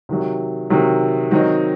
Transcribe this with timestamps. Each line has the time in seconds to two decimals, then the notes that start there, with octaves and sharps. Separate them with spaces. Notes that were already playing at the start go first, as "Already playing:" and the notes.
0.09 C3 D#3 F#3
0.70 C3 D#3 F#3
1.31 D#3 F#3 C4 D#4